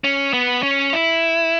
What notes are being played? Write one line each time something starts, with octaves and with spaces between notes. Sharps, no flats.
C#4
B3
C#4
E4